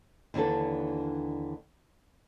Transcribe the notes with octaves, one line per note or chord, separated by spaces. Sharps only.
D#2 D3 E3 D4 A4